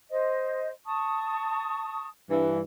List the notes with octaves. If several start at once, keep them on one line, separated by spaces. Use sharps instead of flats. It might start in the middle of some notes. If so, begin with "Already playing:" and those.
C5 D#5
A5 C#6 D#6
G2 E3